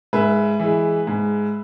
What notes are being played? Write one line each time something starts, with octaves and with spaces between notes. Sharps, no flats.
G#2 B4 E5
E3 G#3
G#2